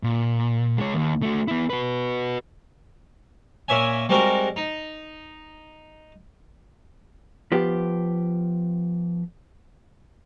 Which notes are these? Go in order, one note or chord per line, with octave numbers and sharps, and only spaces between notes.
A#2
G#3 C#5
D#2
A3 F#4
B3 E4
F#4 B4
A#2 C#4 E5 G#5
G3 G#3 C4 F#4 A#4
D#4
F3 B3 G4